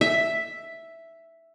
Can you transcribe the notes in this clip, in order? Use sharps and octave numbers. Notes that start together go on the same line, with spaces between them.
E5